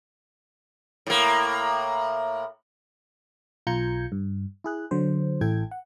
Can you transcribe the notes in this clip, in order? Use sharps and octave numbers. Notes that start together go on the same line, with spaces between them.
A2 A#3
B1 F4 A#5 G6 G#6 C#7
G2
E4 G#4 F#6
D3 F#3 C5
A1 E4 A4 G5 G#6
F#5